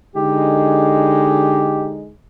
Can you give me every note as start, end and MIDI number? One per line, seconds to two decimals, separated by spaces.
0.16 2.10 50
0.16 2.10 56
0.16 2.10 63
0.16 1.92 67